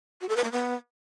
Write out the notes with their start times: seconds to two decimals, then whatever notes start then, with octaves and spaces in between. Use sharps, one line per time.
0.21 F#4
0.29 A4
0.36 B4
0.44 A#3
0.52 B3